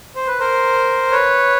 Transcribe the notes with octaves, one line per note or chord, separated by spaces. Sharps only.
C5
B4
A#4 C5
B4 C#5